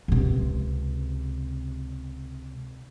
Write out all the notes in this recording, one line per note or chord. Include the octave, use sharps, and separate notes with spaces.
C#2 C3